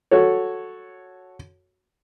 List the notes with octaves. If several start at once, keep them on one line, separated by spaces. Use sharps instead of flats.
F#4 A4 C#5